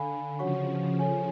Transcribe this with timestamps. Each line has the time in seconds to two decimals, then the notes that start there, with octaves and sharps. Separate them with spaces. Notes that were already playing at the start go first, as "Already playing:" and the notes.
Already playing: D3 A4 F5 G#5 B5
0.39 C#3 F3 F#4 C#5 F#5 C#6
0.99 A4 C#5 G#5